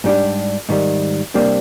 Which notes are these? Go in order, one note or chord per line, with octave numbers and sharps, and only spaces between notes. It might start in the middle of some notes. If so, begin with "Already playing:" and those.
G#2 G3 D4 G4
G#2 D#3 G3
C3 G3 A#3 D4